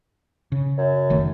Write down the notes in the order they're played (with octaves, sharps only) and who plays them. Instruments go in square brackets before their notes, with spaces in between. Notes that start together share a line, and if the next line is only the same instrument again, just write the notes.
[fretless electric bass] C#3
[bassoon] F#2
[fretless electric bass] F1 D#3 A3